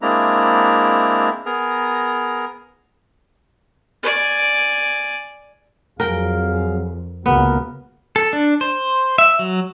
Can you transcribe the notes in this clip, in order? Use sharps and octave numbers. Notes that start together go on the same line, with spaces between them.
G#3 A#3 C4 D4 E4 A#5
B3 G#4 A#4 A#5
D5 G#5
F2 F#3 G#4 A#4 F5 G5
C#2 C#3 A#3 B3 F#4 A#4
A4
D4
C5
E5
F#3